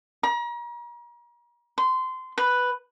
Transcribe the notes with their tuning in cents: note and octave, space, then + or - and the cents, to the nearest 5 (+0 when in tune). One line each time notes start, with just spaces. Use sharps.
A#5 +40
C6 -20
B4 +0